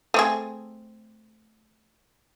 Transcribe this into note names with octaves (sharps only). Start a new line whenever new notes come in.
A3 C4 G#4